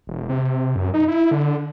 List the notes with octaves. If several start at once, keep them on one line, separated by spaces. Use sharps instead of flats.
E1
C3
F#2
D#4
E4
D3